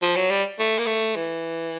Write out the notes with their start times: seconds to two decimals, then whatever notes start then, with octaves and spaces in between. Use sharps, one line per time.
0.02 F3
0.16 F#3
0.31 G3
0.59 A3
0.79 A#3
0.87 A3
1.16 E3